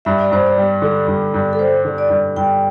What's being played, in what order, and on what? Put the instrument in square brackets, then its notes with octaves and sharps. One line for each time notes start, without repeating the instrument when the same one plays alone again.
[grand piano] G2 [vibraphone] E5
[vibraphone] D5
[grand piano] G2 [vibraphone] C5
[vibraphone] D5
[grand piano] G3
D3
G2
G2
[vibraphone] A4
[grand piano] G3 [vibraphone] C5
[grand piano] D3
[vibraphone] D5
[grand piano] G2
[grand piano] G2 [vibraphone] G5